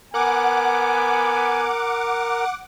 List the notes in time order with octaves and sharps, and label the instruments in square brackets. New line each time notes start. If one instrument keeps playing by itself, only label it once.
[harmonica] B3 G#5 [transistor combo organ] A#4 [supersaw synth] F#5 D6